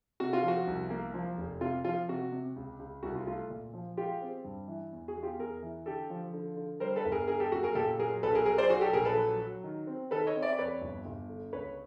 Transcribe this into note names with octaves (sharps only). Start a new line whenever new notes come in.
C3 F#4
F4
F3
F#4
C2
A#3
F3
F1
C3 F4
F3 F4
C3 F#4
C3
C#2
C#2
C2 F#4
F4
A3 F4
A#2
F3
G#3 F4 G4
C4
G2
E3
E2
F#4 G#4
E2
F4 G4
E2 G#4 A#4
E3
D3 G4 A4
F3
D3
D3
G3 A#4 C5
A4 B4
G1
G#4 A#4
D3 G#4 A#4
G4 A4
F#2 F#4
G#4 A#4
A#2 G4 A4
F#3 G#4 A#4
B1 A4 B4
G#4 A#4
F#3 G#4 A#4
C5 D5
F#3 F#4 G#4
G4 A4
A#1 G#4 A#4
A4 B4
F#3
F#3
D#3
C4
D#3 A4 B4
C#5 D#5
C4
D5 E5
D5
F2 B4 C#5
G1
G1
D3
C#2 B4 C#5